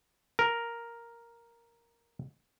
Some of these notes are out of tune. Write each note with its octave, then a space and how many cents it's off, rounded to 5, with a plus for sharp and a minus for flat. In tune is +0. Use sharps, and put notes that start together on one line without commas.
A#4 +0